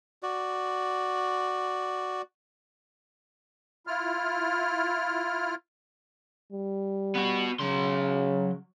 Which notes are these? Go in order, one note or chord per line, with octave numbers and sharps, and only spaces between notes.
F#4 D5
E4 F4 F6
G3
B3 F#4
C#3 F#3 C6